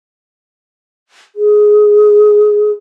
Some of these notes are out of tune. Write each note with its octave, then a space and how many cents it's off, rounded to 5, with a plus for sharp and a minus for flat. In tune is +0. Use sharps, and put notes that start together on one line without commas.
G#4 +10